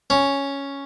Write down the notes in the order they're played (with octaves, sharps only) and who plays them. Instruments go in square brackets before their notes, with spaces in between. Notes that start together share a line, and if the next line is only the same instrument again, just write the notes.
[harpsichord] C#4